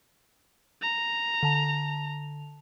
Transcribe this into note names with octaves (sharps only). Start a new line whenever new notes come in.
A#5
D3 A5 F7